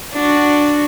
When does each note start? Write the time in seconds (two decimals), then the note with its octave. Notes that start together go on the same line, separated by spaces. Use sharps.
0.13 D4 F#4